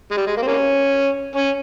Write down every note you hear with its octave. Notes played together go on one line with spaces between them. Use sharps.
G#3
G3
G#3
A#3
C4
A#3 C#4
C#4